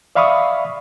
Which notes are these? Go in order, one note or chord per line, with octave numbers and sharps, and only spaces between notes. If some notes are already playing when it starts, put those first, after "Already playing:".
D5 E5 F5 B5 C#6 D#6